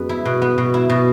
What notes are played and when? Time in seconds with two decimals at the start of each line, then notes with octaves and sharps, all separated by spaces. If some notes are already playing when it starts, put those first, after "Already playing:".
Already playing: F#2 G#3 B3
0.09 E4
0.25 B2
0.42 B3
0.58 B2
0.74 E4
0.90 B2